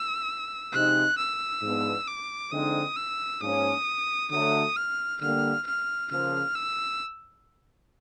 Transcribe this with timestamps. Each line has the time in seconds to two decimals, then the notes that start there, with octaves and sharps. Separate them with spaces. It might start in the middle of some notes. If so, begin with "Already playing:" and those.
Already playing: E6
0.72 C3 F3 G#3 C4 D#4 F#6
1.18 E6
1.62 G#2 F3 G#3 B3 D4
2.07 D6
2.51 D3 F3 G#3 C4 D#4 D#6
2.96 E6
3.41 G#2 F3 A#3 C#4 D#6
4.31 D3 F#3 A3 D#6
4.76 F6
5.21 D3 G3 A#3 F6
5.66 F6
6.11 C#3 F3 A#3 F6
6.55 E6